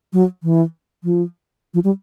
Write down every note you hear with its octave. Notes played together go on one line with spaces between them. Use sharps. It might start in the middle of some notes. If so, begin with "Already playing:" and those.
F#3
E3
F3
F3
G3